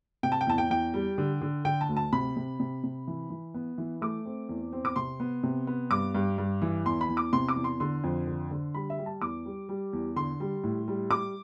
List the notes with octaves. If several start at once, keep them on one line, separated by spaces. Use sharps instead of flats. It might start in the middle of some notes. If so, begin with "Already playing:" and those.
C3 G5
A5
G5
E2 A5
G5
E2 G5
G3
D3
D3
D3 G5
A5
D2
A5
C3 B5
C3
C3
C3
E3
E3
B3
E3
A3 D6
C4
E2
C4
D6
C3 C6
B3
C3
B3
G2 D6
G2
G2
E3
E2 C6
B5
E2
D6
C3 C6
D6
E2
C6
D3 C6
F2
D3
D3
G3 B5
E5
G3
A5
E2 D6
G3
G3
E2
D3 C6
G3
A2
G3
G3 D6